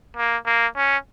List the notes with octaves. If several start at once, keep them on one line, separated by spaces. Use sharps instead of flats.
A#3
A#3
C#4